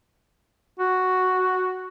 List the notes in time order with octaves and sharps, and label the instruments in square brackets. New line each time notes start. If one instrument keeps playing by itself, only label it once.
[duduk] F#4